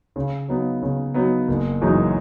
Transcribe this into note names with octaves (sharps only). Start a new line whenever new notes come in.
C#3
F#3 B3 D#4
C#3
F#3 B3 D#4
F#1
F#2 E3 G#3 D#4